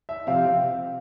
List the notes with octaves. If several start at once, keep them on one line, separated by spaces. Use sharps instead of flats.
E5
C3 F3 C4 G4 F5